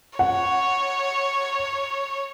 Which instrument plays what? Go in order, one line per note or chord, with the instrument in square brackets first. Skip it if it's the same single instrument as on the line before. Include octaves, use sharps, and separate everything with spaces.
[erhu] C#5 [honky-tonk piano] F#5